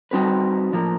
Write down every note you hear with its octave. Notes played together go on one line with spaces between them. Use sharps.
G3 C4 D#4 F#4 B4
A2 F3 A#3